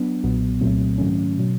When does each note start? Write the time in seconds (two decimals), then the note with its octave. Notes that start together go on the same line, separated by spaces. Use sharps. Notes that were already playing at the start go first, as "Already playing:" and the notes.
Already playing: F#3 B3 D4
0.23 B1 A#2 F#3 B3
0.61 C2 A#2 F#3 A3 C4
0.98 G#2 D#3 F#3 A3 C#4
1.37 B2 F#3